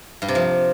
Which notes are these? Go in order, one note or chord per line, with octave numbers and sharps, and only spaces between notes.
G2
C3
F3